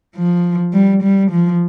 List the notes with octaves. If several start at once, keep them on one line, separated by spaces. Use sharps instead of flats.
F3
G3
G3
F3